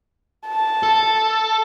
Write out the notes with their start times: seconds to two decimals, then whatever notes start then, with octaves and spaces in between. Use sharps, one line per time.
0.47 A5
0.83 A4